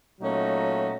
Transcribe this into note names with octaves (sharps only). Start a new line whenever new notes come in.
A#2 F#3 A3 C#4 D#4 F#4